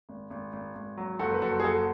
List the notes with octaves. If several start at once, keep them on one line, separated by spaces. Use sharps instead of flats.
G#1
G#1
G#1
G#1
F#3
F#1 F#4 A4
B4
F#1 F#4 A4
G#4
F#1 F#4 A4